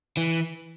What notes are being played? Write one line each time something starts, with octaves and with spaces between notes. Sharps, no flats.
E3